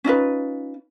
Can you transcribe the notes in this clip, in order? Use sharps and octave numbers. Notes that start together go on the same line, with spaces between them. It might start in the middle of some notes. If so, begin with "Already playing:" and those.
C#4 D#4 F4 B4